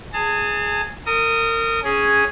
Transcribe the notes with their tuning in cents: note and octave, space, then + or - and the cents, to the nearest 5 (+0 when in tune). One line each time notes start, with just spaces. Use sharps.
G#4 +0 A5 +35
A#4 -30 D#6 +0
C#4 +0 G#4 +0